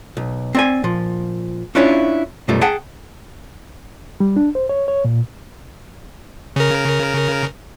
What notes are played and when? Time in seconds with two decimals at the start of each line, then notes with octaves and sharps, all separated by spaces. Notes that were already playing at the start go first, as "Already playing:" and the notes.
0.17 B1
0.55 C4 D5 G#5
0.84 A#2 F3
1.75 C#4 D4 E4 F4 C#5
2.48 F#2 B2 G3 A3 F4
2.61 G#4 F#5 G5 A5
4.20 G3
4.36 D4
4.55 C5
4.69 C#5
4.88 C#5
5.05 A#2
6.56 C#3 A#4